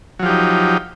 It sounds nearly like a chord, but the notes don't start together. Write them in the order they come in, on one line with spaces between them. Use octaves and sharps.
F#3 F3 G4 D#4